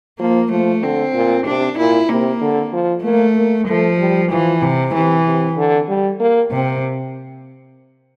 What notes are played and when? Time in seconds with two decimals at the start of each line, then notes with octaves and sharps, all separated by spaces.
0.19 F3 A#3
0.51 F3 A3
0.82 D3 C4
1.14 A#2
1.46 C3 D4
1.78 A#2 E4
2.09 C3 A#3
2.41 D3
2.73 F3
3.04 A3 A#3
3.36 A#3
3.67 F3 A3
3.99 G3
4.30 E3 F3
4.62 C3
4.94 C3 E3
5.26 C3
5.57 D3
5.89 G3
6.20 A#3
6.51 C3 C4